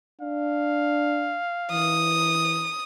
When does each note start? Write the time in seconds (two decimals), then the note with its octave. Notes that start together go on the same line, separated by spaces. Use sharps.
0.21 D4 F5
1.72 E3 D#6